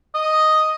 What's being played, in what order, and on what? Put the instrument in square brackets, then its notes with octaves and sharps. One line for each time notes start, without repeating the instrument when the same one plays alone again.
[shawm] D#5